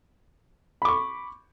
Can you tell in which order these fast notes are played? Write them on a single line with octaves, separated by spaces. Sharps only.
B5 D6 C#6